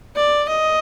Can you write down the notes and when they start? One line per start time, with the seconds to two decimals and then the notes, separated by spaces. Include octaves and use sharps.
0.16 D5
0.49 D#5